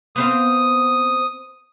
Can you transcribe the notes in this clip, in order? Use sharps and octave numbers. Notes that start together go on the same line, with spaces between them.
B3 C4 F5 D#6